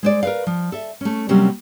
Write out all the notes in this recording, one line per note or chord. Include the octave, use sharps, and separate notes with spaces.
G#3 C5 D5
A#4 B4 F5
F3
A4 E5
A3 C#4
C3 F#3 G3 A#3 C4 C#4